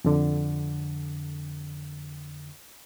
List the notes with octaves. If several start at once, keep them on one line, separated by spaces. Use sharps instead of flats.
F2 D3